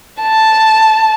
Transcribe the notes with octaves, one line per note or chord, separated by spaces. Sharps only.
A5